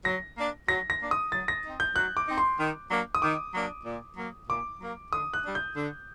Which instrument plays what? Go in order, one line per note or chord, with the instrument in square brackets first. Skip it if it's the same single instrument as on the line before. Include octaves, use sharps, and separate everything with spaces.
[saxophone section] F#3 [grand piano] A#6
[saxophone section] A#3 D4
[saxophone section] F#3 [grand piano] A#6
[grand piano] A#6
[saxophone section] A#3 D4
[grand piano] D#6
[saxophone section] F#3 [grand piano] A6
[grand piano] A#6
[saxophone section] C4 D#4
[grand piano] G6
[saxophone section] F#3 [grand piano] F#6
[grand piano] D6
[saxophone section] C4 D#4
[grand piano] C6
[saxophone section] D#3
F#3 A#3 D4
[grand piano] D#6
[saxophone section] D#3 [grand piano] D6
[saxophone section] F#3 A#3 D4
A#2
F#3 A#3
[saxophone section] A#2 [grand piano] D6
[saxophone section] F#3 A#3
[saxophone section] D3 [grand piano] D#6
[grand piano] F#6
[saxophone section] G3 D4
[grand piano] G6
[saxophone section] D3